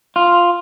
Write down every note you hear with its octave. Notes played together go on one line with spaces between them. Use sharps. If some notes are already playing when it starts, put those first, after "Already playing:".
F4